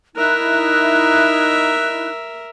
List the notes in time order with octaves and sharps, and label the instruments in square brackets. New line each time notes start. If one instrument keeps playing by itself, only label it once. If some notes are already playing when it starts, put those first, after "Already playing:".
[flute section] D#4 E4 F#6 [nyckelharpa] A#4 E5